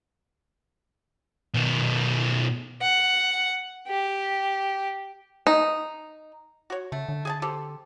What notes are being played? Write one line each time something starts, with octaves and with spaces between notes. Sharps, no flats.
B2 D#3
F#5
G4
D#4
F#4 C#5
C#3 A3
D3
G#4 G#5 A5
C4 G4 A4